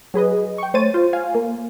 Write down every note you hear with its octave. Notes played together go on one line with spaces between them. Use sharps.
F#3 G#4 B4 D#5
G5 C#6
A3 C5 C#5 A6 D#7
F4 C5
F5 G#5
A#3